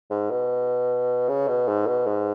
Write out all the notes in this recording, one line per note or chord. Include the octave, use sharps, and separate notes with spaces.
G#2
B2
C#3
B2
G#2
B2
G#2